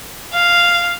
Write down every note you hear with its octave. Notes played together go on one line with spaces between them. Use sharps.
F5